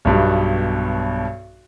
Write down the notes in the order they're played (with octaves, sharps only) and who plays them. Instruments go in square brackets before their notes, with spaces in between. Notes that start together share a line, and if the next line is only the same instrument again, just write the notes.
[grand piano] B1 G2 B2